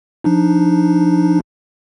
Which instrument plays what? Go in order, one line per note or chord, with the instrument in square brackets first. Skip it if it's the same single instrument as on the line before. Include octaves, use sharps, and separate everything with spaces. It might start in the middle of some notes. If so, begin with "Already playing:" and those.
[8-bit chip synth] F3 D4 D#4